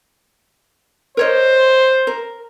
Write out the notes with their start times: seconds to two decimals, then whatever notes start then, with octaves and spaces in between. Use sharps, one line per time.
1.17 A#4 C5 C#5 D#5
2.07 A#4